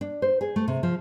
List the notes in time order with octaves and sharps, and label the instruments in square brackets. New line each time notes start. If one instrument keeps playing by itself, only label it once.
[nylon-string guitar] D4
C5
G#4
A3
C3
F3